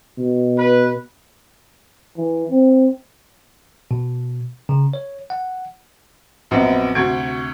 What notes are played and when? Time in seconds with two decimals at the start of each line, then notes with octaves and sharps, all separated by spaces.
0.18 B2
0.58 B4
2.17 E3
2.51 C4
3.91 B2
4.69 C#3
4.93 C#5
5.30 F#5
6.51 A#1 F#2 B3 C4 D#5
6.95 D2 C3 F#4 C#6 G#6 D7